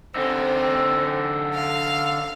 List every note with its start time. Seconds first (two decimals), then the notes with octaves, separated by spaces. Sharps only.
0.16 D3 C4 D#4
1.54 F5